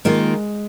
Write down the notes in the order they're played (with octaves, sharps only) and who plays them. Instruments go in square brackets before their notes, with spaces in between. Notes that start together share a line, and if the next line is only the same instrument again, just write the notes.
[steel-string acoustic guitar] D#3 A#3 F4 [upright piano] G#3